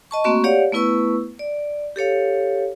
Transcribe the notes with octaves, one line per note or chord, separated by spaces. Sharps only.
D#5 A5 C#6
A3 A#3 C4 F#4 C6 C#6
G4 C#5 D5 F5 F#5
A3 B3 E4 B4 C#6 E6
D5
G4 A4 C#5 F5